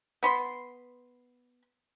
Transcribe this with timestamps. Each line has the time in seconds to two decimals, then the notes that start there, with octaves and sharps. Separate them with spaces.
0.23 B3 B5 C6